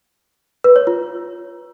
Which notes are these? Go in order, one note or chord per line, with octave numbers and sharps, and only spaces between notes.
B4
C#5
F4